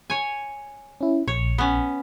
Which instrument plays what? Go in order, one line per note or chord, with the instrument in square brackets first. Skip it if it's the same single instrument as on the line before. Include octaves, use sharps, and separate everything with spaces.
[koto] C#5 G#5
[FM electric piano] C#4 E4
[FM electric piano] A#1 [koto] C#5
[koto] B3 C#4